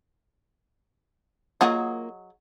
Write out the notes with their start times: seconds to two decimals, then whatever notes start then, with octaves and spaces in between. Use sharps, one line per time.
1.61 F#3 A#3 F4 G#4 D#5 F#5